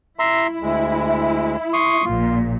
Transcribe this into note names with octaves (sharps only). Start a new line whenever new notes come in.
E4 E5 A#5 C6
D2 G#3
C6 C#6 D#6
A#1 A#2 F4